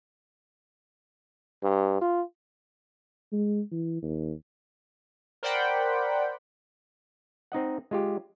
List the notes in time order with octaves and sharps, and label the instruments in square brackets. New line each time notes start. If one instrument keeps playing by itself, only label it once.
[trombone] G2
F4
[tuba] G#3
E3
D#2
[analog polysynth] A#4 C5 D5 F#5 G5 B5
[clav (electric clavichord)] C4 D#4 D#5 F#5
G#3 F4 G4